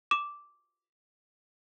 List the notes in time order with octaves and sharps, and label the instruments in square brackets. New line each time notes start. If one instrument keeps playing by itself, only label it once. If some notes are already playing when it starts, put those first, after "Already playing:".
[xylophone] D6 E7